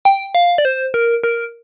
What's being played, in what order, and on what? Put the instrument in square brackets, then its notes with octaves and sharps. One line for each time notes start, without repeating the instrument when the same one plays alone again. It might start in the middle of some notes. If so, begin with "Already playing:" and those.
[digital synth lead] G5
F5
D5
C5
A#4
A#4